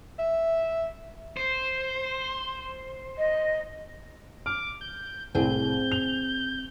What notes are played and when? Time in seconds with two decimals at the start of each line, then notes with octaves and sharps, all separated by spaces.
0.19 E5
1.37 C5
3.18 D#5
4.46 D6 F6
4.81 G6
5.35 C2 A2 C4 G#4 G6
5.92 F7